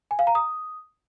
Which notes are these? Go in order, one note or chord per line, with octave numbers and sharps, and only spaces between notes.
G#5
F5
A#5
D#6